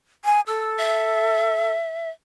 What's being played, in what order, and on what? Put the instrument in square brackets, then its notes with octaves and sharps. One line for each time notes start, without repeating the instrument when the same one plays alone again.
[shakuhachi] G#5
[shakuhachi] A4 [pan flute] E6
[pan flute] E5